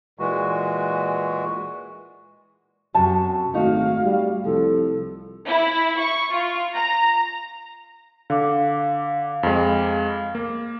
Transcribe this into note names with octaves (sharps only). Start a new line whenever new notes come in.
A#2 E3 G#3 F#4
F#2 C3 F#4 A5
G#1 A3 D#4 F#4 F5
G3
C2 F3 A4
E4
C#6
F4
A#5
D3 F5 D6
F2 G#3
A#3